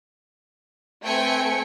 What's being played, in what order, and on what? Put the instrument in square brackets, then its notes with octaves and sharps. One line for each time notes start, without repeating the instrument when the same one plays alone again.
[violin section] A3 C4 B4 G5 G#5 C#7